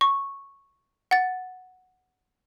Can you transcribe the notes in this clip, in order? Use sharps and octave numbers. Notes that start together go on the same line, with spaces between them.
C#6
F#5 A6